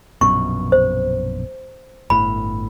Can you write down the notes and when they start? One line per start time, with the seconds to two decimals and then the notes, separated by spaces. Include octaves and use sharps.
0.21 A#1 F#2 B2 C#6
0.72 C5
2.10 G1 A2 B5